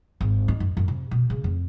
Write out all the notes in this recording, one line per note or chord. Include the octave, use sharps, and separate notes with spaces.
G#1
D#4
F#2
F#2
C3
B2
C#3
F2